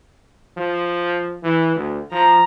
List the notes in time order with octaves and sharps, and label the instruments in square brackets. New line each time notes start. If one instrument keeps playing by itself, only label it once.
[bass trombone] F3
E3
D2
[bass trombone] F3 [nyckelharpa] A#5